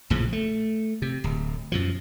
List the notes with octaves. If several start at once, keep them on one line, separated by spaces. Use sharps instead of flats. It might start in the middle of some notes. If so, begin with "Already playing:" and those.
A#1 A2 C#3 F3
A3
C3
D1
F#2 B2 F3